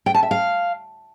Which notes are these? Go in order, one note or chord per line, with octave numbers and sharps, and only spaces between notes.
G5
A5
E5
F5